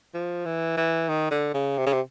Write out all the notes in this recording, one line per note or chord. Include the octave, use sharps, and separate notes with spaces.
F3
E3
E3
D#3
D3
C#3
C3
C#3
C3